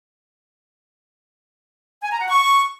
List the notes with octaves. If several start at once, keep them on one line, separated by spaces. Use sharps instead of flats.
G#5
A#5
F#5
C#6